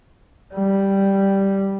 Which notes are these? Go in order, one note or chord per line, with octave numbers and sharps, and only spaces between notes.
G3